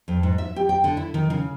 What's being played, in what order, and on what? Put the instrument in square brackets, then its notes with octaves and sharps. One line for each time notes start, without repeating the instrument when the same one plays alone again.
[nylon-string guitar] F2
G#2
E5
G4
G5
D3
E4
D#3
C#3